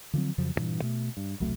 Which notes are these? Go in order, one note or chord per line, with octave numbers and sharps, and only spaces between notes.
D3 F3 F#3 C4
F2 C#3 F3 F#3
D2 G2 A#2 E3
B2 A3
G2
E1 C2 F#3 A3